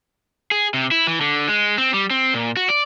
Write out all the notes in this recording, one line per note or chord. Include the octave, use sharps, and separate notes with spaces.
G#4
C3
E4
E3
D3
G#3
C4
G3
C4
A#2
F#4
D5